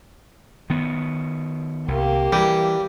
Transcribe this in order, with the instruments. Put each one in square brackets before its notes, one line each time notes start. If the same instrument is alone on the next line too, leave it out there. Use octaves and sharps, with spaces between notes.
[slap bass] D#3 B3
[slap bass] C2 [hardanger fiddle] A#3 G4
[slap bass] E3 [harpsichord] G3